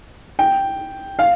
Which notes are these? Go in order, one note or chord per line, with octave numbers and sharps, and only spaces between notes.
G5
F5